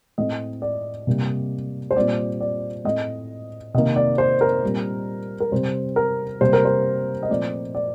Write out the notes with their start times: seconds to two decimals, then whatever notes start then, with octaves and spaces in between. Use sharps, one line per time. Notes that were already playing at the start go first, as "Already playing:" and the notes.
0.18 A2 A3 C4 D#5
0.62 D5
1.07 C3 G3 A#3
1.91 C5
1.96 A#2 G3 C4 D5
2.41 D5
2.85 A2 A3 C4 D#5
3.74 C3 D#3 A#3 D#5
3.96 D5
4.18 C5
4.41 A#4
4.63 A#2 G3 C4
5.40 A#4
5.52 C3 G3 C4 C5
5.96 A#4
6.41 C3 G3 A#3 C5
6.53 A#4
6.65 C5
7.23 D#5
7.29 A#2 F3 A3 C4 D5
7.75 D5